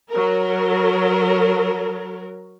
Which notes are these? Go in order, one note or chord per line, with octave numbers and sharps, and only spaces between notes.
F#3 A#4